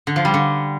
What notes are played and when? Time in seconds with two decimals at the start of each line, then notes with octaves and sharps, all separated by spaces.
0.07 D3
0.16 F3
0.25 G3
0.34 D3